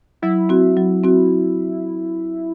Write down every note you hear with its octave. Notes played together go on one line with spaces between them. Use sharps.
F#3 E4
C4 F#4
F#3
C4 F#4